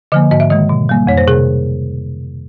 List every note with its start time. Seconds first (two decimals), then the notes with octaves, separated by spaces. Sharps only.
0.12 D3 F3 A#3 D#5
0.31 G#2 D#5
0.40 E5
0.50 D#3 G#3 D#5
0.69 B2
0.89 G3 A#3
1.07 F2 C#5
1.17 C5
1.27 C3 G#4